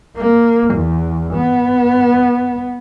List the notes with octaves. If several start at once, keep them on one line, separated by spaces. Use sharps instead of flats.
A#3
E2
B3